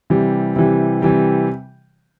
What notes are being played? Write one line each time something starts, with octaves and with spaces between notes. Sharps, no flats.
C3 E3 G3
C3 E3 G3
C3 E3 G3